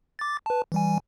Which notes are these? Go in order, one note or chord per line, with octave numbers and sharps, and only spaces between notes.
D6 A6
B4 A5
E3 G3 G#5